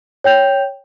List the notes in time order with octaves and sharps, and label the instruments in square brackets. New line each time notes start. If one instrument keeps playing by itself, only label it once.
[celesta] C#5 G5 G6 F7